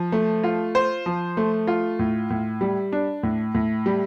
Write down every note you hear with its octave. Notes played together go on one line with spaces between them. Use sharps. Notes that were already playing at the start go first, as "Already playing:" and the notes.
Already playing: F3
A3
F4
C5
F3
A3
F4
A2
A2
G3
D4
A2
A2
G3